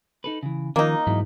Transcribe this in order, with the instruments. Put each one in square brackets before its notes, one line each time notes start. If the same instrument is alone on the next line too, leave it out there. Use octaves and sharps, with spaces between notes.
[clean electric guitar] D#4 A4 B4
C#3 E3
[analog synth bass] D#3 [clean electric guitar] F3 C#4 F4 [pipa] A#3 D#4
[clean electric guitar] E2 F#3 E4 [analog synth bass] G#2